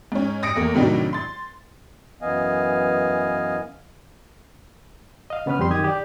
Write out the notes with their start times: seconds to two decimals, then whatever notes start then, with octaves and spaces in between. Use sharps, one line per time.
0.12 G#2 C#4
0.43 D#6 A#6 C#7 D7
0.56 E2 A3 A#3
0.75 A2 C3 D#3 F#3 D4
1.13 C6 A6
2.22 F#2 E3 B3 D#5 F5 G#5
5.30 D#5 F5
5.46 C#3 B3 C#4 B4 F6
5.59 F2 G3 C4 G4 C6
5.70 F#2 D#3 G4 D#6 G#6
5.84 G4 D5